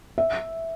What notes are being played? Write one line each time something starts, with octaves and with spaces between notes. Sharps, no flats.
E5